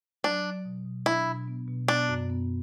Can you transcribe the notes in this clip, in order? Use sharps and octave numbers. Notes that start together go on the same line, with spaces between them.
F#3 D4
F#3
B2
B2
D4 E4
B2
B3
B2
B3 D4
F#2
B3